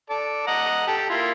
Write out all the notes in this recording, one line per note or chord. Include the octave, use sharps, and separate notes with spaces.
A4 D5
D#5 F#5 A#5
G4 A4
A#3 E4 F4